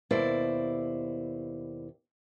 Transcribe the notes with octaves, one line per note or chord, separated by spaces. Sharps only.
D#2 B2 E4 C5 D5